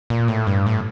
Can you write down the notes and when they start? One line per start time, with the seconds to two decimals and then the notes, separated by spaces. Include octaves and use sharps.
0.10 A#2
0.28 A2
0.47 G2
0.66 A2